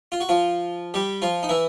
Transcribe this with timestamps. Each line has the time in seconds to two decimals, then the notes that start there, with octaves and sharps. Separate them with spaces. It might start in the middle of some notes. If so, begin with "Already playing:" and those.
0.12 F4
0.21 F#4
0.29 F3 F4
0.94 G3 G4
1.22 F3 F4
1.43 D#4
1.49 E3 E4